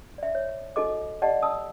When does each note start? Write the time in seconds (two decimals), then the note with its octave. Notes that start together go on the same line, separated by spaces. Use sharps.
0.18 D5 E5
0.35 C#5
0.76 D#4 F#4 G#4 A4 D#5 D6
1.22 G4 D5 D#5 F#5 A5
1.42 A5 D#6 E6